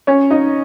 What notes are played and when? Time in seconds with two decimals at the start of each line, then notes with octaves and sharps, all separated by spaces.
0.07 C#4 C#5
0.30 D#4 D#5